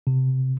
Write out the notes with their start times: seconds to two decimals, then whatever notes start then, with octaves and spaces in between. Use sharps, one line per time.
0.07 C3